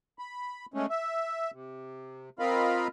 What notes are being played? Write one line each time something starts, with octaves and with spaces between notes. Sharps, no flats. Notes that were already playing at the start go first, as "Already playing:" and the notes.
B5
G#3 A3 C#4
E5
C3
C4 F4 A#4 D#5 F5 B5